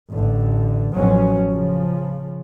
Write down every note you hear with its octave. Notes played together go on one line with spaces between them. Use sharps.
A1 D3
A1 B2 F3 F#3 C#4
C#3 F3